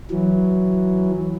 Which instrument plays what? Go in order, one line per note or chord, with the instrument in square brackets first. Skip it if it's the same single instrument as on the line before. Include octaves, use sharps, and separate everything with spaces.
[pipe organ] E3 F#3